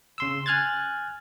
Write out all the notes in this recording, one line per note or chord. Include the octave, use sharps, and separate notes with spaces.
C#3 C6 E6
G#5 F6 F#6 G#6 A6